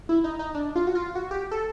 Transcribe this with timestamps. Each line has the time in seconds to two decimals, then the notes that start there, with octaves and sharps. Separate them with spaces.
0.09 E4
0.24 D#4
0.39 D#4
0.55 D4
0.76 F4
0.87 F#4
0.95 F4
1.15 F#4
1.31 G4
1.51 A4